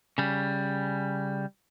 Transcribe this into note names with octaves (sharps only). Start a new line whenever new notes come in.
C#3 G3